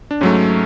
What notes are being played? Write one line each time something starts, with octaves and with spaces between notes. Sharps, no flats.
D4
G#2 F#3 A3 C#4